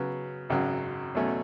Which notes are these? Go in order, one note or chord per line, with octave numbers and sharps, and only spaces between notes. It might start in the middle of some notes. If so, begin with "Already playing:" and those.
Already playing: C#3 F#3 B3
G#1 F#2 C#3 F#3
E2 B2 F#3 A3 C#4